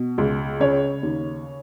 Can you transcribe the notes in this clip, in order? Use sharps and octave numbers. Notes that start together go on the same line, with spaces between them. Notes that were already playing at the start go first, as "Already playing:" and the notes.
Already playing: B2
C#2
C#3 C#5
D#2